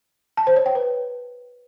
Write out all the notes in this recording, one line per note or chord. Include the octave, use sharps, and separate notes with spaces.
A5
C5
C#5
G5
B4